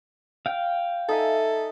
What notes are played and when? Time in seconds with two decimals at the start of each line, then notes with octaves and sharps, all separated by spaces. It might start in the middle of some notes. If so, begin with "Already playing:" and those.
0.46 F5 G5
1.09 D#4 A4 E5 G#5